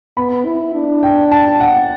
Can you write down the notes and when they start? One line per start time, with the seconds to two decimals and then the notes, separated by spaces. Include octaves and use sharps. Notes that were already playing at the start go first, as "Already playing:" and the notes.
0.17 B3 B5
0.46 E4
0.75 D4
1.03 G5
1.31 A5
1.60 F#5